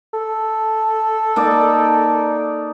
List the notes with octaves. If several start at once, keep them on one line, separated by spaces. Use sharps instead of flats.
A4
A#3 D#4 D5